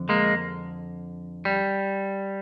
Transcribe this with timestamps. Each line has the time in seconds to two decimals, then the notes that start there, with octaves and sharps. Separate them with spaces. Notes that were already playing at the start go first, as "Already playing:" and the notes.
Already playing: F2 D3
0.09 G#3 A#3
1.45 G3